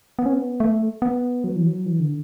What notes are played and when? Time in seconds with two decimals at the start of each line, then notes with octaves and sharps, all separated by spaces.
0.19 B3
0.26 C#4
0.33 B3
0.60 A3
1.02 B3
1.44 F#3
1.56 E3
1.67 F#3
1.86 E3
2.00 D3